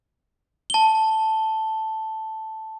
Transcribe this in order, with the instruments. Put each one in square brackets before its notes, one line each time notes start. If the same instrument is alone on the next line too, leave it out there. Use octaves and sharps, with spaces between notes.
[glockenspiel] A5 G7